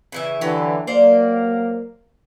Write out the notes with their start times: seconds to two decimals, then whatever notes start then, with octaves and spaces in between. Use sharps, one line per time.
0.12 C#3 E3 E5
0.41 D3 E3 F#3 G4
0.87 F#3 A#3 C5 D5 F5